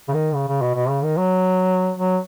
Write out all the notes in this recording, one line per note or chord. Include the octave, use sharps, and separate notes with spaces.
C#3
D#3
C#3
C#3
B2
B2
C#3
D#3
F#3
F#3